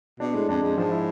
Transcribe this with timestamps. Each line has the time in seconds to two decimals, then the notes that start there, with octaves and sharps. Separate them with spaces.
0.20 B2 D4
0.34 A2 G#3
0.49 F2 D4
0.63 F2 G#3
0.78 G#2 F3
0.91 E4